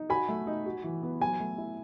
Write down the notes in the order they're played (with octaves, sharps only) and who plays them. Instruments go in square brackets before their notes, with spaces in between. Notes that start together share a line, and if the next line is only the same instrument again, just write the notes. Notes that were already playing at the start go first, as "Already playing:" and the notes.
Already playing: [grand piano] D#4
[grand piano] F#4 [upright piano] G#5 B5
[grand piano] A3
D#4
F#4
E3
B3
[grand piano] F#3 [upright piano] G#5
[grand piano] A3
E4